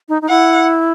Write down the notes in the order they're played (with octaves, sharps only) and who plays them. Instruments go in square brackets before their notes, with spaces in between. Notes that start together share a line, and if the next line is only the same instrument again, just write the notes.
[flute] D#4
D#4
[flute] E4 [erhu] F#5